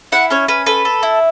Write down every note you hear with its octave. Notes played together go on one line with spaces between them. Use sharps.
E4 F#5
C#4 C#5
C#4 B4
A4 B4
A4
E4